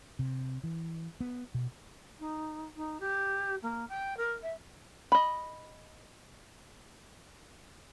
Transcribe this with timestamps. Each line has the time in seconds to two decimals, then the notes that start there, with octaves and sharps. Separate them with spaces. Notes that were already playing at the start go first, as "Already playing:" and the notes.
0.19 C3
0.64 E3
1.21 B3
1.54 B2
2.20 D#4
2.76 D#4
3.00 G4
3.62 A#3
3.89 G5
4.17 A#4
4.43 E5
5.12 D#5 B5